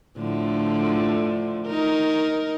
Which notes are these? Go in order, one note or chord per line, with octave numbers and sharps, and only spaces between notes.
A2 D3 F3
D#4 A#4